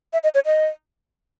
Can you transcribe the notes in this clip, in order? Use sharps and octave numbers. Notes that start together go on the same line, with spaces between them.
E5
D#5
C#5
D#5